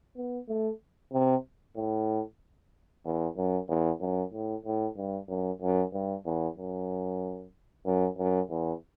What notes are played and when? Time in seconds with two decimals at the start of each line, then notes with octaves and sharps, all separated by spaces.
0.17 B3
0.48 A3
1.13 C3
1.76 A2
3.05 E2
3.37 F#2
3.69 E2
4.01 F#2
4.33 A2
4.65 A2
4.97 G2
5.29 F#2
5.62 F#2
5.94 G2
6.26 E2
6.57 F#2
7.86 F#2
8.18 F#2
8.50 E2